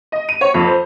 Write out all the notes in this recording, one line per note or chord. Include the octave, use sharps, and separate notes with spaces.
D#5
D#7
C#5
F2
C5